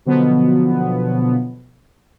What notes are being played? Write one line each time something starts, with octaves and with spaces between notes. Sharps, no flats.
B2 D3 F3 F#3 B3